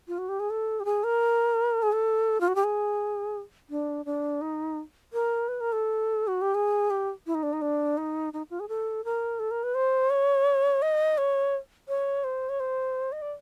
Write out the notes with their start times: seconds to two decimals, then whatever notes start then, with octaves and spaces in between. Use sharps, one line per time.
0.08 F4
0.18 F#4
0.29 G4
0.40 G#4
0.50 A4
0.80 G4
0.85 G#4
1.04 A#4
1.83 G#4
1.92 A4
2.41 F4
2.48 F#4
2.55 G4
2.64 G#4
3.70 D4
4.05 D4
4.41 D#4
5.13 A#4
5.48 B4
5.61 A#4
5.72 A4
6.27 F#4
6.42 G4
6.54 G#4
6.90 G4
7.27 E4
7.35 D#4
7.43 D4
7.53 D#4
7.62 D4
7.98 D#4
8.33 D#4
8.50 F4
8.60 G#4
8.69 A4
9.05 A#4
9.39 A4
9.51 A#4
9.63 B4
9.75 C5
10.10 C#5
10.82 D#5
11.18 C#5
11.88 C#5
12.24 C5
12.49 C#5
12.60 C5
13.12 D#5
13.22 D5